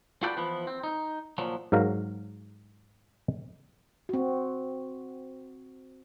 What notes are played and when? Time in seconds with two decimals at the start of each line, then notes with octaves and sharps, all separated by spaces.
0.23 F4 F#4 A4 B4 D5 G5
0.37 E3 F3 B3 B4
0.67 C4
0.83 D#4
1.38 A#2 F3 F#3
1.72 G#2 F#3 A#4 F5 A#5
4.09 C4 F#4